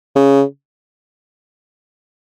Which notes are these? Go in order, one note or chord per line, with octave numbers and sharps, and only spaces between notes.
C#3